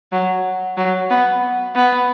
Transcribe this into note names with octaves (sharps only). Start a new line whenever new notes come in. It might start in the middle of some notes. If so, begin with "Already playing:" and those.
F#3
F#3
B3
B3